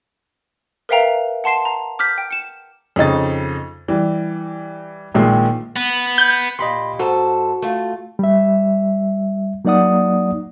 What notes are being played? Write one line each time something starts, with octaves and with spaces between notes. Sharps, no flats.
A#4 B4 E5 F5 G5 A#5
F#5 A5 C6 C7 E7
A#5
D6 F6 G6 B6
G5
C#7 E7
F2 C#3 D#4 A6
E3 G3
A#1 A#2 D#3 G#3
B3
G6
A#2 G4 D#5 B5 C6
G#2 F#4 A4 C5
A3 F4
G3 E5
F#3 A#3 D#4 D5 F#5 D#6